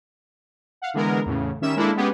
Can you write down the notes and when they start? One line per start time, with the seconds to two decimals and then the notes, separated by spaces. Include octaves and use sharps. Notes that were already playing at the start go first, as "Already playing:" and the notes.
0.82 F5 F#5
0.94 D3 E3 G#3 B3 A#4
1.26 E2 A2 C#3
1.61 D#3 G3 C#4 E5 E7
1.76 G#3 A#3 D4 E4 A4
1.96 G#3 B3 C#4 G4 G#4